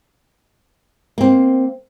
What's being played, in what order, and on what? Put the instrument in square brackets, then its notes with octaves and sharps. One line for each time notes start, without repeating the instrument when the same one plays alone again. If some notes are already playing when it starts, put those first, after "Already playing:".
[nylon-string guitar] A#3 C4